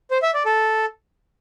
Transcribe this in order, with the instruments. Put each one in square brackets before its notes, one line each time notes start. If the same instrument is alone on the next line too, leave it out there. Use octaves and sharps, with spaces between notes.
[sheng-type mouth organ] C5
E5
D5
A4